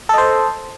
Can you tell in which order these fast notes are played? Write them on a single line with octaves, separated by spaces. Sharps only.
A4 D#5 C5